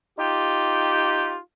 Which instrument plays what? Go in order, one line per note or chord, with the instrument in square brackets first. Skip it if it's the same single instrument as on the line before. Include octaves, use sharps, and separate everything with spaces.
[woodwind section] D#4 F4 G4